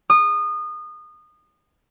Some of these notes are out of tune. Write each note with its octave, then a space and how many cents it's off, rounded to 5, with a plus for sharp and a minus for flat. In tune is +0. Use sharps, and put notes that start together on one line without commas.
D#6 -25